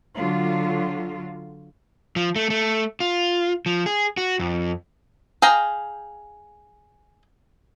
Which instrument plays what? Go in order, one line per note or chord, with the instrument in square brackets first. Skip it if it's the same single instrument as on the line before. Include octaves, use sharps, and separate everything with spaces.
[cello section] D3 F#3 F4
[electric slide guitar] F3
A3
A3
F4
F3
G#4
F#4
F2
[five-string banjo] G#4 F5 G5 A#5